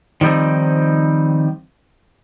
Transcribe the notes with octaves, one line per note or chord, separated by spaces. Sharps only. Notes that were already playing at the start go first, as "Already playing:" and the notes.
D#3 F3 G3 C4 D#4